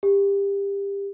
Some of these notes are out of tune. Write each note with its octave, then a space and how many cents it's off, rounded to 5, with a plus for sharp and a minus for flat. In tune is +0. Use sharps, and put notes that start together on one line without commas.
G4 +25